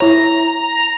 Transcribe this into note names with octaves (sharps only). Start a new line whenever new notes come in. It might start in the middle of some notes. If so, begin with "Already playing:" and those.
E4 C#5 A#5